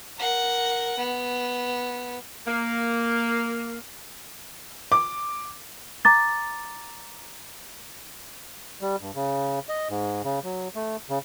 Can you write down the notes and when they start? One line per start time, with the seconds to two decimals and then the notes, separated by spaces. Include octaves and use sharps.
0.17 A#4 F#5
0.97 B3
2.47 A#3
4.92 D6
6.05 A#5 D6 A6
8.81 G3
9.01 G2
9.15 C#3
9.69 D#5
9.90 G#2
10.24 C#3
10.44 F#3
10.75 A3
11.10 C#3